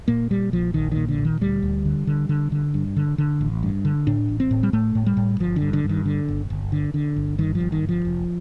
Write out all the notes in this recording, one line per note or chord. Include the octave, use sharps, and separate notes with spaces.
A#2 A#3
A#2 G3
A#1 F3
A#1 D#3
D#3
A#2
D3
A#2
D#3
D2 G3
D2
D3
D3
D3
D3
G2
D3
D3
A1
G2
D3
A2 D4
A1
C4
A2
G3
A2 A3
A2
G3
A2
G1 F3
D3
G2
D3
G2
D#3
D3
G1
G1
D3
D3
G1
G2 D#3
F3
G1
D#3
G1
F3
F1